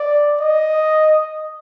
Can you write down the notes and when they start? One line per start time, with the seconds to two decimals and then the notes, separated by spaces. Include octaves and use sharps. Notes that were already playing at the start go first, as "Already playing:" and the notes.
Already playing: D5
0.40 D#5